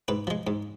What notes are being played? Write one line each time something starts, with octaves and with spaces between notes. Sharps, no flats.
G#2 B4
F3 G#3
G#2